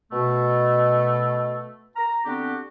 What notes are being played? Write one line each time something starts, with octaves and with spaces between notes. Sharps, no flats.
B2 A3
A#5
D3 B3 C4 D4 F#4 G4